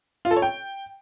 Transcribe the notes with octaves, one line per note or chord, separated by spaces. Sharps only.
F4
A4
C#5
G5